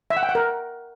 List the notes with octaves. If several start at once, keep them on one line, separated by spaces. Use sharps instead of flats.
E5
F#5
G5
F#5
A#4